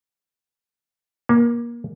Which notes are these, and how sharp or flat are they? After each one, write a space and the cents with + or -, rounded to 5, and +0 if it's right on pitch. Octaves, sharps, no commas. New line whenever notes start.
A#3 +25